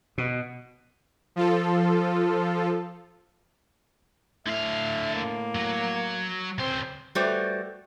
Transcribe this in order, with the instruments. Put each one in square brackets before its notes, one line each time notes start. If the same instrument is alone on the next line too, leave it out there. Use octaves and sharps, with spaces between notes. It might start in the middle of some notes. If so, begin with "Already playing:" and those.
[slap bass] B2
[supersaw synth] F3 F4 A4
[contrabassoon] A2 [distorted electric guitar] D3 F5 [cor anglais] E5
[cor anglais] A#3
[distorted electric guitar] F#3
[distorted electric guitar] C#2 C5 [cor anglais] C4
[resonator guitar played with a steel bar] G3 A3 F#4 B4 C5 D5